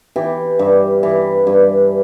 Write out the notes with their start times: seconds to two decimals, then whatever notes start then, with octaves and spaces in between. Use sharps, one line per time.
0.16 E3 G4
0.59 G2
1.03 E3
1.47 G2